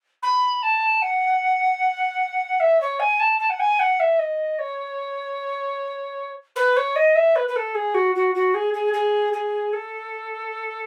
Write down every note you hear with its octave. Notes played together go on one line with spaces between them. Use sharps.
B5
A5
F#5
E5
C#5
G#5
A5
A5
F#5
G#5
F#5
E5
D#5
C#5
B4
C#5
D#5
E5
B4
B4
A4
G#4
F#4
F#4
F#4
G#4
G#4
G#4
G#4
A4